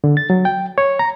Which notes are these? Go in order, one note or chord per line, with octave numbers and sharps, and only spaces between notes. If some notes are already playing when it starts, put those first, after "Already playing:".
D3
A6
F#3
G5
C#5
A#5